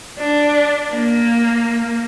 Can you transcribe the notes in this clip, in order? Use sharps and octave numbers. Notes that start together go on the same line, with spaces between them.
D4
A#3